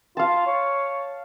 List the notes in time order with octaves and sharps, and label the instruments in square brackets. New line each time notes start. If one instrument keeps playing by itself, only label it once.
[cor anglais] F4 [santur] F5 A5
[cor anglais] C#5